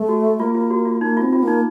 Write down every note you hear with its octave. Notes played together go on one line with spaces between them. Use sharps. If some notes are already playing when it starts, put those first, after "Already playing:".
Already playing: A3
F#4
A#3 F4
F4
F#4
F4
A#3 D#4
C4 F4
F4
A#3 D#4